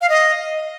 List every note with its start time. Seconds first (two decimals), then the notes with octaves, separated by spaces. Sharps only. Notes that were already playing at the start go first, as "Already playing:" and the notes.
0.01 F5
0.09 D#5